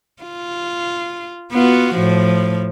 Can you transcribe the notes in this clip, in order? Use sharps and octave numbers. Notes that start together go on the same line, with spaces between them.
F4
B3 F4 F#4
A2 F3